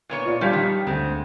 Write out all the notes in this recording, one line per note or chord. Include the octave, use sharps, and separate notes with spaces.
A#2 B3 C#5
F4 D5
G2 A#2 F3 G3 B6
D#3
D2 G#3 C4